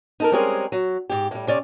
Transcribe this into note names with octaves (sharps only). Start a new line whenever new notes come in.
D#4 A4 A#4
G3 G#3 C4 C#4 G#4 A#4
F#3
G#2 G4
A2 G3
C3 C#4 D5